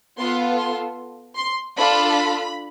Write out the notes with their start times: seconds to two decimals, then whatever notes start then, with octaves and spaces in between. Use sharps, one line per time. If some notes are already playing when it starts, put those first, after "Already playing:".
0.18 B3 F4 A4 C6
0.58 C6
1.36 C6
1.77 D4 F4 A4 B5